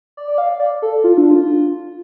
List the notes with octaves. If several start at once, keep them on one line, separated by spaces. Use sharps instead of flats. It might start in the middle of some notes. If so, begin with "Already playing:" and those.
D5
D5
F5
D5
A4
F4
D4
F4